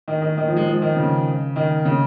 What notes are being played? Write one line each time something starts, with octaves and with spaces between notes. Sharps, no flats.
D#3
D#3
D#3
F3
G#3
F3
D#3
C#3
D#3
C#3